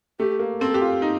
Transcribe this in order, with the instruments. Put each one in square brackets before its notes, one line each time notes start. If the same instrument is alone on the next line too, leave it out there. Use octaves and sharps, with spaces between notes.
[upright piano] A3 [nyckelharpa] G4
[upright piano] A#3
[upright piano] C4 [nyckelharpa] A4
[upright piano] G4
F4
D#4